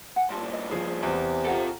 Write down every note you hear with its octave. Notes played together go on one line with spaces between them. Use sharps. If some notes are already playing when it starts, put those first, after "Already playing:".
F#5 G#5
G2 A#2 F4 A5
A#4 D#5
F3 G#4
E2 C3 B3 G#5
F4 G4 A4 F#5 A#5